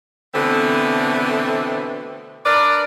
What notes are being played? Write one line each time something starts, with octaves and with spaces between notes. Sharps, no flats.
B2 D3 E3 A3 B3 C4
D4 A#4 B4 D5